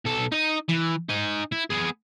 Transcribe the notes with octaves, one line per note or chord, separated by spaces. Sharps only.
B1 A4
D#4 D#5
E3
D#4 G#5
E4
B3 G#4